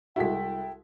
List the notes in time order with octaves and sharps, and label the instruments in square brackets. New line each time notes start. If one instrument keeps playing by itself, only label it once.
[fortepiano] C2 G#3 F#4 [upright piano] E4 A4 B6 [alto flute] G5